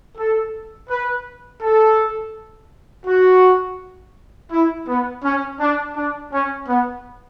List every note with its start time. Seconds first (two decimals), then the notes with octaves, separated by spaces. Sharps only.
0.17 A4
0.89 B4
1.62 A4
3.06 F#4
4.51 E4
4.88 B3
5.24 C#4
5.60 D4
5.96 D4
6.32 C#4
6.68 B3